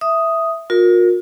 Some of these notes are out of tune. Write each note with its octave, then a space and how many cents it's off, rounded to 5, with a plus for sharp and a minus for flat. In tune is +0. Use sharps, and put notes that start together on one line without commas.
E5 +0 D#6 +0
F4 +45 A#4 +0